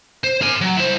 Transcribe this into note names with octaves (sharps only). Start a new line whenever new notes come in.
C5
A#4 G#5
F#3
E4 C5